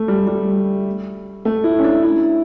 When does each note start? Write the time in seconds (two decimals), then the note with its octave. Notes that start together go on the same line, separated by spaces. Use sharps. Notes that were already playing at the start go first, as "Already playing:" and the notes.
Already playing: A3
0.08 G3
0.27 G3
1.45 A3
1.64 E4
1.79 C#4
1.84 D4
2.03 E4